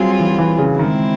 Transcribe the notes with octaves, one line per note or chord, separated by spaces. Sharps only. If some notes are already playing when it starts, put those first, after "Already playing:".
Already playing: F#3 G3 C4 F4 G#4
E3
E3
C#3
D#3 G#3 C4 E4